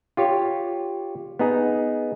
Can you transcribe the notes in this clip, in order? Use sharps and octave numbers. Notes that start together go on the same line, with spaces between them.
F4 G4 C#5
B3 D#4 G#4